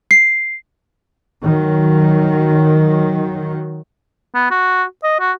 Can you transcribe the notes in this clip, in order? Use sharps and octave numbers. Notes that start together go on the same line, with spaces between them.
C7
D#3 F#3
B3
F#4
D#5
F#4